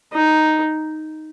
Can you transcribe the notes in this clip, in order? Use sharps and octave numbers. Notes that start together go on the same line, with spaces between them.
D#4